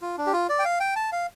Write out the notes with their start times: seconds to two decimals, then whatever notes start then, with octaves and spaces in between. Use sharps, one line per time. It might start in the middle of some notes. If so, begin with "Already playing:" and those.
0.02 F4
0.18 D4
0.26 G4
0.33 F4
0.49 D5
0.59 G5
0.65 F5
0.80 G5
0.96 A5
1.12 F5